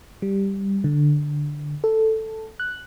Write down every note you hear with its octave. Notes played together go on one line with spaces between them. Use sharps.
G3
D3
A4
F#6